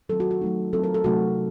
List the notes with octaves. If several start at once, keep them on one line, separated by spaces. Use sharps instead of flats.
D#3 F#3 C4 F4 A4
F#4
F#4
F#3 A3 D#4
F#3 C4 F4 A4
A#4
A4
C3 F#3 A3 D#4 F#4